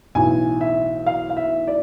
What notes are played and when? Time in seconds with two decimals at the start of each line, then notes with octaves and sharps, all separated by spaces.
0.15 B1 A2 E3 G#5
0.61 E5
1.06 F5
1.30 F5
1.37 E5
1.67 D5